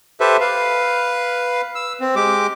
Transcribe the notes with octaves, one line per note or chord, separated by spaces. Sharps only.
G4 A4 B4 C5 E5
B4 F5
E6
C4
G#3 G4 D6